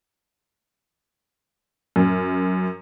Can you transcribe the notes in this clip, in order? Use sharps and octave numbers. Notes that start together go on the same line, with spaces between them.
F#2